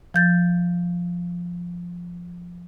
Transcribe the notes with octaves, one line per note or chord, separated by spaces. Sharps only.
F3 G6 A6